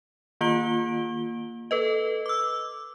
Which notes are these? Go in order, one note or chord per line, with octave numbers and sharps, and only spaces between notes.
D#3 A#3 F4 D7 G7
A4 B4 D#5
D6 E6